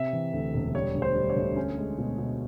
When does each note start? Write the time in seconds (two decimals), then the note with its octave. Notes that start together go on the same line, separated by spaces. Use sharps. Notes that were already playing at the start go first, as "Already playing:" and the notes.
Already playing: C3 E5
0.13 E3
0.33 D2
0.54 E1
0.75 G3 C#5
0.95 D2
1.02 C5
1.15 G3
1.30 C#5
1.36 D2
1.56 C#4
1.78 G#3
1.98 B2
2.18 B2